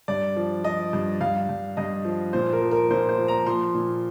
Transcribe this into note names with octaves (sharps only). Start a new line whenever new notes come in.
G2 D5
F3
F3 D#5
G2
G2 F5
G2
G2 D#5
F3
A#2 C5
A#4
F3
A#4
A#2 C5
C5
F3
A#5
F3 C6
A#2